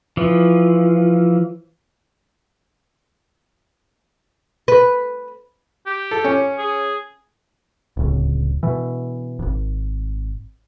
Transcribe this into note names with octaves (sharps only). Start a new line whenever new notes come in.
E3 F3
B4
G4
A4
C#4
G#4
D1 C#2
B2 E3
D#1 G#1